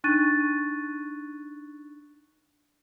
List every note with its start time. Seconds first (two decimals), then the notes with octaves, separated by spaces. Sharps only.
0.04 D4 D#4 C#6 F#6 A6 D#7